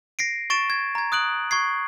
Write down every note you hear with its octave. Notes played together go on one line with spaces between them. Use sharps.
A#6 C7 D7
C#6 A6 D7 E7
G#6
A#5 G#6
D#6 F#6 D7 F#7
C#6 G#6 C7